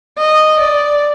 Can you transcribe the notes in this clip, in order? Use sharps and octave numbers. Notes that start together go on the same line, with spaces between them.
D#5
D5